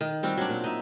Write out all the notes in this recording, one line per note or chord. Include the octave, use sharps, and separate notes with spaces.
D#3
G3 C4 F4 F#4
F#3 D4
A#2
D#4 E5